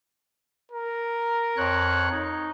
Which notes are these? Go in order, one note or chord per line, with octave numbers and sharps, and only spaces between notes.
A#4
F2 C#5 F#6
D#4